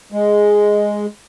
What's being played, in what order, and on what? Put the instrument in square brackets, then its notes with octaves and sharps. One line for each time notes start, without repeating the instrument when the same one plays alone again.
[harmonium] G#3